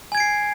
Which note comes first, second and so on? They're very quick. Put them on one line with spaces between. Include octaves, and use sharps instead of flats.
G#5 G#6 D7 C7